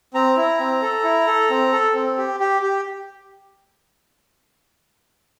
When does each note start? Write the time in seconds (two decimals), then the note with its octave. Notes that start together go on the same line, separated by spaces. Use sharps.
0.14 C4 A#5
0.37 E4
0.59 C4
0.82 A4
1.04 E4
1.27 A4
1.50 C4
1.72 A4
1.94 C4
2.18 G4
2.40 G4
2.62 G4